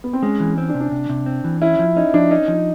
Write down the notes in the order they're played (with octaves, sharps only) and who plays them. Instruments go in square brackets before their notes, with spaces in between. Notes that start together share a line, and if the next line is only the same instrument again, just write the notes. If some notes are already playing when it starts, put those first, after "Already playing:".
[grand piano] B3
C4
[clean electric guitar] G#3 [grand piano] C#4
[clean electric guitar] E3
[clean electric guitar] C4 [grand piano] C#4
[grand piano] D4
[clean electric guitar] C3
[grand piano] D4
[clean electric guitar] C3
C3
C4
E3
[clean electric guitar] C#4 [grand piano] E4
[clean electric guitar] F3
[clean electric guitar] C#4 [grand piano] D#4
[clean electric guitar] F3 [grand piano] D4
[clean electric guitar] C#4 [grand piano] D#4
[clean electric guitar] F3